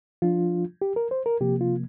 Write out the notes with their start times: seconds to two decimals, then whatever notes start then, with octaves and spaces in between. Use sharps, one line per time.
0.22 F3 D4 F4
0.82 G4
0.96 A#4
1.11 C5
1.26 A#4
1.41 C3 F3 A#3 G4
1.61 F4